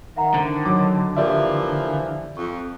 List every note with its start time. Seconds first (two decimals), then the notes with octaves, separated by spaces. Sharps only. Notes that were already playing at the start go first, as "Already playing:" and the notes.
0.16 D#3 E5 F#5 A#5
0.34 D3 C5
0.65 F#3 D6
1.17 E3 F3 A#3 G4 D5 E5
2.37 F2 C#6